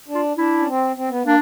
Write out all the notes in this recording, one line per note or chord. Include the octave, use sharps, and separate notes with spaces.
D4
F4
D4 E4
C#4
C4
C4
B3
A#3 D4